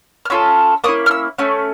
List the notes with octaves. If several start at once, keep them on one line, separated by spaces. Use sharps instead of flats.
F6
C#4 F4 A4 E6
A#3 C#4 E4 D#6
F6
E6
A3 C#4